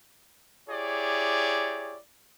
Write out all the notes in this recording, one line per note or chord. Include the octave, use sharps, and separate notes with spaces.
E4 G4 G#4 C#5 D5